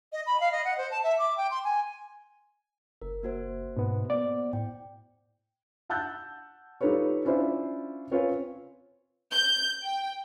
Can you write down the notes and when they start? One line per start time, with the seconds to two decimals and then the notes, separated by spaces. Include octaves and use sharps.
0.13 D#5
0.26 B5
0.40 F5
0.52 D#5
0.65 F#5
0.78 C5
0.91 A5
1.04 E5
1.19 D6
1.37 G5
1.51 C6
1.65 G#5
3.02 F#1 A#4
3.23 A#3 F#4 C5
3.76 G#2 B2 B3
4.10 B3 D5
4.53 A2 G5
5.89 F#5 A5 E6 F#6 G6 A6
6.81 G3 D#4 F4 A4 B4 C#5
7.25 C#4 D4 E4 F4 C5
8.11 C4 C#4 F4 B4 C#5
9.32 G6
9.84 G5